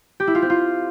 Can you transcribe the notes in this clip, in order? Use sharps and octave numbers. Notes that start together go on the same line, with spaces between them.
G4
E4
F4
C4
F4